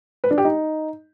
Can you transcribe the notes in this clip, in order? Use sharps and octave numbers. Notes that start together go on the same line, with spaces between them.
B4
D4
G4
D#4